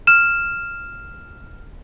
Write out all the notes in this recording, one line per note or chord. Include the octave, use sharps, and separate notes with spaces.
F6 E7